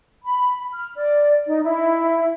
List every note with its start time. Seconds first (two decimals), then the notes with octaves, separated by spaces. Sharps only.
0.23 B5
0.73 F6
0.96 D5
1.46 D#4
1.64 E4